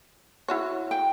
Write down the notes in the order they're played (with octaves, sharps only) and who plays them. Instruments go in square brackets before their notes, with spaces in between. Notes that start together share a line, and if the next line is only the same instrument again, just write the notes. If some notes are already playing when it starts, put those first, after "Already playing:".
[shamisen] E4 F#4 C#5
[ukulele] G5